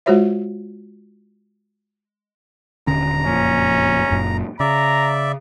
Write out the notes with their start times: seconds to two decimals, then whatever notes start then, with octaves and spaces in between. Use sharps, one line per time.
0.06 G#3 F4 F#4 C5 C#5 E5
2.87 D#1 D3 C#4 A#5
3.26 F#1 F2 A#2 C#4
4.11 F#1 F#2 A#2
4.60 C#3 D5 E5 A#5